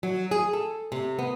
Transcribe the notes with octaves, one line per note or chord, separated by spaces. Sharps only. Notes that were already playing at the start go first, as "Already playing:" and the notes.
F#3
G#4
A4
C3
B3